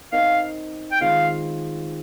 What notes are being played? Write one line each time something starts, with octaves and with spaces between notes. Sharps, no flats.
C4 D#4 A#4 D#5 F5
G5
D#3 G#3 C4 F4 F5